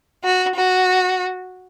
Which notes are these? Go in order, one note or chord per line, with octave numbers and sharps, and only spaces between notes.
F#4
F#4